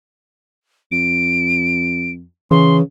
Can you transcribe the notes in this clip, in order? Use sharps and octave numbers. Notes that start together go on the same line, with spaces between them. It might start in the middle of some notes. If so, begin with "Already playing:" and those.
F2 D7
C#3 E3 C6